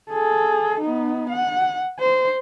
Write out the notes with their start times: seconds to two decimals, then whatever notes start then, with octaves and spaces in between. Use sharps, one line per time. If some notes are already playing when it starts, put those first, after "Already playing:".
0.11 G#4 A4
0.81 B3 D#4
1.30 F#5
2.00 C5